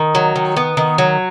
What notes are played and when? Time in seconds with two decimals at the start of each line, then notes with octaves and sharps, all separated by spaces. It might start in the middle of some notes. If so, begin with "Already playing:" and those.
Already playing: D#3
0.15 F#3
0.36 D#3
0.56 B3
0.77 D#3
0.98 F#3